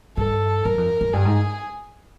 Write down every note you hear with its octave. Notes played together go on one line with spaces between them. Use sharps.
G2 A4
F#2 A#4
F2
F#2
G2 G#4
G#2